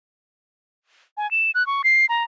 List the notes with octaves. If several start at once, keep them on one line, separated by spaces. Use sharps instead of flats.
G#5
E7
F#6
C#6
C7
A#5